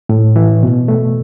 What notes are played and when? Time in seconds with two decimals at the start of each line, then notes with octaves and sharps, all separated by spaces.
0.09 A2
0.36 E3
0.63 B2
0.88 A3